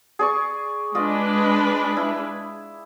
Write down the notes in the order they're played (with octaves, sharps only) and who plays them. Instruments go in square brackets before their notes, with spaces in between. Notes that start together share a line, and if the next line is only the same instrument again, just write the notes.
[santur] G#4 D5 C#6
[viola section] G#3 D4 B4 [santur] F4 D5 D#5
[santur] E4